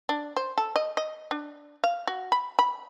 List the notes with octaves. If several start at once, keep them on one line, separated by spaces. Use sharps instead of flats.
D4
C5
A4
D#5
D#5
D4
F5
F#4
B5
B5